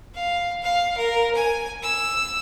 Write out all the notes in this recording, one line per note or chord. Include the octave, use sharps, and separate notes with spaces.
F5
F5
A#4
G#5
E6